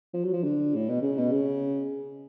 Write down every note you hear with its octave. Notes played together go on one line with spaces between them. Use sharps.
F3
F#3
F3
D3
A2
B2
C#3
B2
C#3